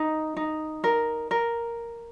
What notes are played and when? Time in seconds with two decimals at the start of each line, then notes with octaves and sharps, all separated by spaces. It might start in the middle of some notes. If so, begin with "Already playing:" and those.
Already playing: D#4
0.37 D#4
0.84 A#4
1.31 A#4